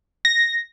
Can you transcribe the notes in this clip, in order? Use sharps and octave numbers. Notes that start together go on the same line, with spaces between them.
A#6